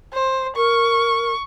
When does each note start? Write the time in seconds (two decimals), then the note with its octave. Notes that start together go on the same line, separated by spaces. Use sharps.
0.13 C5
0.56 A#4 C#6